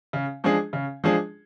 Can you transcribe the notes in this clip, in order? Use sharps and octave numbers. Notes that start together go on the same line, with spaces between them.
C#3
F3 G#3 D4 G#4
C#3
F3 G#3 D4 G#4